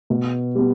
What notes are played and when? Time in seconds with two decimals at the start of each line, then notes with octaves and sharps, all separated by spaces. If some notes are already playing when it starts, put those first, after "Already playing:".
0.10 B2
0.55 G3 B3